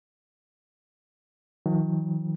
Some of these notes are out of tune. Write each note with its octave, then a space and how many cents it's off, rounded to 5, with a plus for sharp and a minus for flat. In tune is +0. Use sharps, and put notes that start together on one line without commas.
D#3 +35 F#3 -40